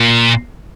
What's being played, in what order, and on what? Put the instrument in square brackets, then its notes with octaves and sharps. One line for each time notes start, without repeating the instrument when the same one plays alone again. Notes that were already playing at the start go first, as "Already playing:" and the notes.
Already playing: [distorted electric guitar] A#2